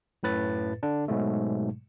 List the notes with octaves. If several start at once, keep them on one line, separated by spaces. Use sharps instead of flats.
F#2 A2 B4 A6
D3 D4
G#2 B2 F#3 G#3 A3